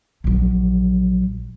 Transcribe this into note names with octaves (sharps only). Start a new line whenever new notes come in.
A#1 F#3